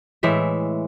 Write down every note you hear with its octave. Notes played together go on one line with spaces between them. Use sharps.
A2 E3 G#3 E5